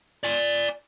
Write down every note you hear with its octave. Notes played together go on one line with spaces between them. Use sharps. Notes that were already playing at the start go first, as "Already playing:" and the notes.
D5 G#5